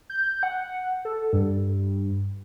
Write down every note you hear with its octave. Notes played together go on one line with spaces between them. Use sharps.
G6
F#5
A4
G2